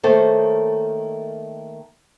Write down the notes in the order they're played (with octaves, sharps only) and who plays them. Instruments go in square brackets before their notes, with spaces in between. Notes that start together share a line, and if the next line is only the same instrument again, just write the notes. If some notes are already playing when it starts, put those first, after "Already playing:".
[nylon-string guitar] D#3 A3 A#3 A4 C5 C#5